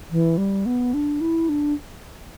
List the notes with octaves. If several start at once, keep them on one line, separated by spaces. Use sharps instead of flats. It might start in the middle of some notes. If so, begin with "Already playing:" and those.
E3
G3
B3
D4
E4
D4